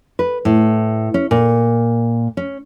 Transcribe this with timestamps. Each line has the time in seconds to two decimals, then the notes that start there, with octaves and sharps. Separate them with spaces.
0.19 B4
0.45 A2
1.14 C#4
1.31 A#2
2.37 C#4